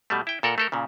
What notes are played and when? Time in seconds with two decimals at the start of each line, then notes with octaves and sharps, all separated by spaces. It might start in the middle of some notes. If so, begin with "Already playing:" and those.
0.10 B2 G3 A3
0.27 E4 G5
0.43 A#2 A4 A#4 F#5
0.58 A3 A4 A#4
0.72 A#2 C#3